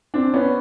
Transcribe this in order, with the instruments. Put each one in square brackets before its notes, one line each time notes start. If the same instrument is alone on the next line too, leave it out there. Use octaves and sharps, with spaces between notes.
[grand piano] C4 D4
B3 C#4